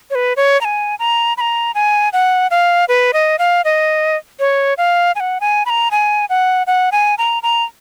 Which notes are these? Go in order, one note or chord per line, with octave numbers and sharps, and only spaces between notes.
C#5
B4
C#5
A#5
G#5
A#5
B5
A#5
G#5
F#5
F5
B4
D#5
F5
D#5
C#5
F5
G#5
F#5
G#5
B5
A#5
G#5
F#5
F#5
G#5
A#5
A#5